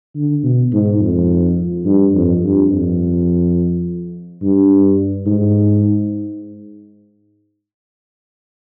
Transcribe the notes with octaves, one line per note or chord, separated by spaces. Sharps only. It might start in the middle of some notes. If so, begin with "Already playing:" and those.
D3
B2
G#2
F2
G2
F2
G2
F2
G2
G#2